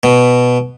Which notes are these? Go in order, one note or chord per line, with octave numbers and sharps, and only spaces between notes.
B2